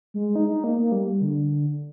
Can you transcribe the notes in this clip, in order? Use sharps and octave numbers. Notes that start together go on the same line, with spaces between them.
G#3
D#4
D#4
A#3
A#3
G3
D3